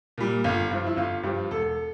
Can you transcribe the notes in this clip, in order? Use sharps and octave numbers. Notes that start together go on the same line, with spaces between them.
A#2 G3
G1 F4
G2 F3
E4
G1 F4
G2 F3 G4
E1 A4